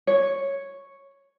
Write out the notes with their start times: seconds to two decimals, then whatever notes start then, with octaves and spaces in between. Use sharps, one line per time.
0.07 C#5